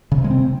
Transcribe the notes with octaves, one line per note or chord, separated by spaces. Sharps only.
C#3
C3
G#3
C4